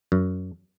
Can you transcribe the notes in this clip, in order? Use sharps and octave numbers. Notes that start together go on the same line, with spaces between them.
F#2